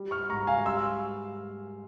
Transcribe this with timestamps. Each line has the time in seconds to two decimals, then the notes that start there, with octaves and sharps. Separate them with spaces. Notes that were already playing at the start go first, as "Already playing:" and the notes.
Already playing: G3
0.11 C#6 F6
0.29 G#2 A#5 C#6
0.47 F5 G#5
0.65 G3 C6 E6